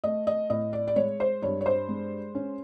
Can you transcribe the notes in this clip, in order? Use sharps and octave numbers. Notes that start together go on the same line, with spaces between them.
A3 D#5
D#5
A2 D#5
D5
D5
G#3 C#5
C5
G2 C#5
C#5
C5
G#3
C#4